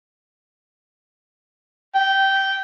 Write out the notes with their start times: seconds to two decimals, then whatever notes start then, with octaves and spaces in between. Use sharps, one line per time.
1.95 G5